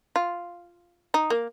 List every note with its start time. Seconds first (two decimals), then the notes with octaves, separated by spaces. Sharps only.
0.16 F4
1.14 D#4
1.30 A#3